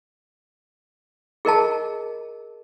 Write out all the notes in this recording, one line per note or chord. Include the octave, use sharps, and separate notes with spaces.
G#4 A#4 D#5 A5